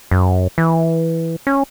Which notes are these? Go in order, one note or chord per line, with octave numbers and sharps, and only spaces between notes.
F#2
E3
C#4